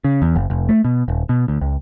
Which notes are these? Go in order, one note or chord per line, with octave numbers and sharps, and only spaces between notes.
C#3
E2
F#1
F1
A3
B2
D#1
B2
D2
C#2